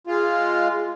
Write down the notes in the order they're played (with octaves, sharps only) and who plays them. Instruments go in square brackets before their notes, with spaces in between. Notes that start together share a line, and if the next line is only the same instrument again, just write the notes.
[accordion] G#3 F4